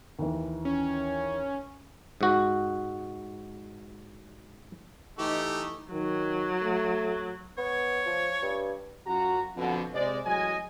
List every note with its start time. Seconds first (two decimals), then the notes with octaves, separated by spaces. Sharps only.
0.19 D#2 E3
0.65 C#4
2.21 G#2 F#4
5.19 E3 A3 D#4 G4
5.92 D#3 F#3
6.62 A3
7.58 B3 C#5
8.06 F3
8.42 G2
9.07 F#2 F4 F#4 A#5
9.56 F2 B2 D3
9.94 C3 G#3 C5 D5
10.25 A1 F#3 G#3 D#5 G#5